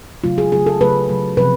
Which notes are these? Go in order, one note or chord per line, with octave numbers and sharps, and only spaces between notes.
C#3 F#3 A3 F4
G#4
C#3 F#3 A3 G#4
A4
C#3 F#3 A3 B4
C#3 F#3 A3
C3 F3 B4